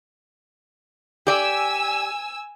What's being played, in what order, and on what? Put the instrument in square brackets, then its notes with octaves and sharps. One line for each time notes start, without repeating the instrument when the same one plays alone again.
[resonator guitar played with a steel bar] G4 D5 [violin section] G#5 E6